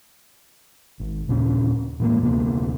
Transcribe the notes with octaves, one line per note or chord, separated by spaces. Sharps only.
G#1
D#2 A#2 C#3 C#4
A2 E3 G#3 A#3
D2 C3 A#3 B3